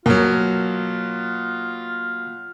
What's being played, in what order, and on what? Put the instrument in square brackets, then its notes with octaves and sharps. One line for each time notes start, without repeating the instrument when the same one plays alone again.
[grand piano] B2 F#3 [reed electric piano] A#3 [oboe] F4